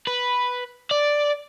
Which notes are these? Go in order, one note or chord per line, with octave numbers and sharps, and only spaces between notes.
B4
D5